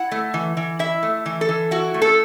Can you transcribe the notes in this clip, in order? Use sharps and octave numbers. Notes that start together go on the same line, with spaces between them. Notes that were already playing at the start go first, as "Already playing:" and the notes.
Already playing: E4 F#5
A3
E3
E3
E4 E5
A3
E3
A4
E3
E4 F#4
A3
A4